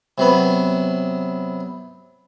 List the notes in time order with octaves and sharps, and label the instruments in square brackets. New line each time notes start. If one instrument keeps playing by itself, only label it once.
[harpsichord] C3 F#3 B3